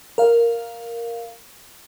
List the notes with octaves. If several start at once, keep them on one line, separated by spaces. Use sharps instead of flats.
A#4 F5